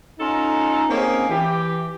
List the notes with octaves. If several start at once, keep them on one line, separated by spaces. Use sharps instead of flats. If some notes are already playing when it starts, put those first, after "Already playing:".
C#4 D#4 F4 A4 A#5
A#3 C4 C#4 D#4 G#4
E3 G4